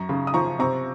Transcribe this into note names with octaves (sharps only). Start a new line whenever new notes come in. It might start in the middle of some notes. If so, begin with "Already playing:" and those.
Already playing: F#2 A#5 C#6
C#3
D#6
F3 A#5 C#6
C3 A#5 C#6